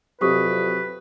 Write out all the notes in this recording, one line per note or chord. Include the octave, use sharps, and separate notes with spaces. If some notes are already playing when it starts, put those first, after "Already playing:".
F2 C3 F#3 G4 B4 C#6 D#6